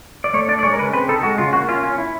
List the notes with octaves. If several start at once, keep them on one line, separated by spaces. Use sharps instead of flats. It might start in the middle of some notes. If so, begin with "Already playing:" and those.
D5
A3 C#5
D4 D5
D5
G#3 C#5
A#4
C#3 B4
C4 B4
D#4 A4
G#3 F#4
C#3 F4
A#3 F#4
C#4 F4
C#4
E4